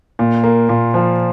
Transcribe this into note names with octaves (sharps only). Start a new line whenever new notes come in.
A#2
A#3
A#2
F3